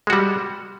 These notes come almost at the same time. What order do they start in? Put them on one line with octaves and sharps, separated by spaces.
G#3 F#4 G3